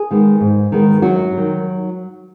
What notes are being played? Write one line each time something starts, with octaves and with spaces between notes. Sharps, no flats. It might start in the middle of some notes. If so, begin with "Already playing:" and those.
Already playing: G#4
D#3 G#3 B3
G#2
D#3 G#3 B3
F#2 F#3 F#4
D#3 G3